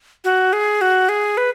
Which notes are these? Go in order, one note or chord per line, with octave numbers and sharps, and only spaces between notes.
F#4
G#4
F#4
G#4
B4